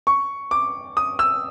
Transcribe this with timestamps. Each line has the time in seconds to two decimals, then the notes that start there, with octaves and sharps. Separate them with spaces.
0.07 C#6
0.51 D6
0.97 D#6
1.19 E6